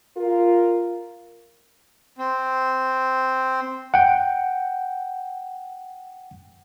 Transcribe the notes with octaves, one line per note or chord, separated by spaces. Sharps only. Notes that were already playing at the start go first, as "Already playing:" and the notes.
F4 A#4
C4
F#5 G5